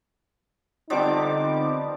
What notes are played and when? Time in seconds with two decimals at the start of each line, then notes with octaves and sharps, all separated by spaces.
0.90 D3 F3 G3 B3 C4 D#4 D6